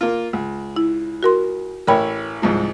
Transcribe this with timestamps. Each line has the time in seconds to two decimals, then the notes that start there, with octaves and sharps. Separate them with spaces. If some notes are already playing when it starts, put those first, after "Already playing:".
0.01 A#3 F4
0.33 C#2
0.76 E4
1.23 F#4 A#4 C6
1.87 A1 E4 A#4 C#5 G5 B5
2.42 C2 G#2 F3